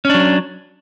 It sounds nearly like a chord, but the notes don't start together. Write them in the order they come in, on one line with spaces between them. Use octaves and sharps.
C#4 D4 F#3